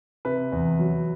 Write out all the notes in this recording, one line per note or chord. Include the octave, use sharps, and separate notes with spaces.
C3 B4
E2
F#3